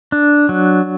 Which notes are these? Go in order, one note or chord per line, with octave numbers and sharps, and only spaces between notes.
D4
F#3